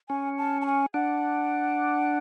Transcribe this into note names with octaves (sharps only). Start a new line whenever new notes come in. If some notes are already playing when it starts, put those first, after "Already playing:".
C#4 G#5
A5
A5
G#5
D4 F#5